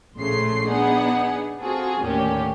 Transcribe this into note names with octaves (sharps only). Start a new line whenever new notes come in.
A#1 A2 C#3 A3 C6 C7
B3 D4 D#4 G#4 F#5
C4 F4 F#4 G#4 A4
D#2 A2 D3 A#3 C#4 G4